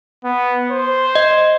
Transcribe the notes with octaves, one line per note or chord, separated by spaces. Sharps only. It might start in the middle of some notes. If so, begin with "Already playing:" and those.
B3
C5
D#5